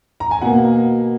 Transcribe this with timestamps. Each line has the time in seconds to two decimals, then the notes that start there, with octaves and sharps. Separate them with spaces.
0.20 A#5
0.31 G#5
0.42 B2 A#3 F#5